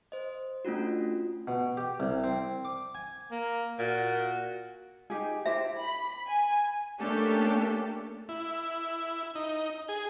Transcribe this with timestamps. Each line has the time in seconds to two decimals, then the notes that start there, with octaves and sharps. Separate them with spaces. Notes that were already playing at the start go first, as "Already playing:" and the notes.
0.12 C5 D#5
0.65 A3 C#4 D4 F4 F#4
1.48 B2
1.77 G4
2.00 C2
2.24 C4
2.65 D6
2.95 G#5
3.31 A#3
3.79 A#2 F#4
5.10 D#4 G4 G#4
5.46 E4 G4 C5 E5
5.80 B5
6.28 G#5
6.99 A3 A#3 C#4 D4 G4 A4
8.29 E4
9.35 D#4
9.89 G#4